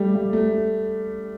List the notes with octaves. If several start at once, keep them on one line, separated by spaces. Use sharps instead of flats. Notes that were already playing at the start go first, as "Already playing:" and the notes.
Already playing: G3 A3
G3
A3